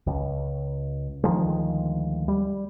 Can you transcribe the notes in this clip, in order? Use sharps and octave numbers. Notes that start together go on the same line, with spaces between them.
C#2
D2 D#3 F3 G#3
G3